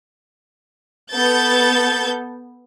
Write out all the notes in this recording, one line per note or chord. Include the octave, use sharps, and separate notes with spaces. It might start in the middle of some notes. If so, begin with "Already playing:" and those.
B3 A4 G6 A6